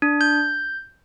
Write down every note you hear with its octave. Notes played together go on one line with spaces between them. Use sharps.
D4
G6